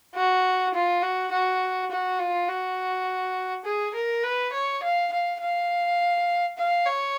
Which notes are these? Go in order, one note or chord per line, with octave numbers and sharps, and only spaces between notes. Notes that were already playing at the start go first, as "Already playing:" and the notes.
F#4
F4
F#4
F#4
F#4
F4
F#4
G#4
A#4
B4
C#5
F5
F5
F5
F5
C#5